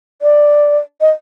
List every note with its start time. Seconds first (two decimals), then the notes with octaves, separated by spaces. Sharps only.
0.22 D5
1.01 D#5